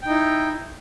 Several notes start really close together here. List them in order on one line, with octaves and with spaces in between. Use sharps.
G5 D#4 E4